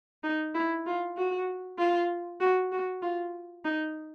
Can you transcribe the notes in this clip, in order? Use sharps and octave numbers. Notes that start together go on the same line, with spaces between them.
D#4
E4
F4
F#4
F4
F#4
F#4
F4
D#4